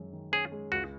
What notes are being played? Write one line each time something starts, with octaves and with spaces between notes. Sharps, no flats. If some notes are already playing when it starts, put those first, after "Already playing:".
Already playing: F#2 D#3 G#3 C#4
D#3
C#4 G#4
G#3
C#2 F#4